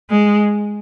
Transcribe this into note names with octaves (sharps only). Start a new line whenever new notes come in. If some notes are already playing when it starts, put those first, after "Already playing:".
G#3